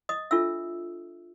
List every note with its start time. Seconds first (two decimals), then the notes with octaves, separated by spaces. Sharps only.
0.09 D#5 D#6
0.31 D4 F4 A4 E5 E6